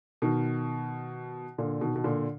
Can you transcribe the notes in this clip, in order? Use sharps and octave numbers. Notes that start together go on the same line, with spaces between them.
B2 D#3
A#2 D3
B2 D#3
B2
A#2 D3